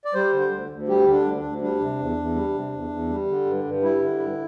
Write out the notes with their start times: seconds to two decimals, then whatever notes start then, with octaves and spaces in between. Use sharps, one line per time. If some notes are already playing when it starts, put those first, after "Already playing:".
0.05 D5
0.14 G3 C5
0.33 D3
0.39 C5
0.51 D2
0.70 D2
0.88 G3 G4
1.06 D3
1.13 D4
1.25 D2
1.37 D4
1.43 D2
1.62 G3 D4
1.80 C3
1.98 E2
2.17 E2
2.35 G3
2.54 C3
2.72 E2
2.90 E2
3.09 G3
3.27 D3
3.45 G2
3.64 G2
3.82 G3 E4
4.01 D3
4.19 G2